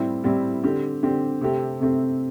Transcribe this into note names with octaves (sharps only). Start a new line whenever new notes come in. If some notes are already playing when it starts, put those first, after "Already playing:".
Already playing: A2 G3 C4 E4 G4
A2 G3 C4 E4 G4
D3 C4 G4
D3 C4 G4
C3 A3 C4 G4
C3 A3 C4 G4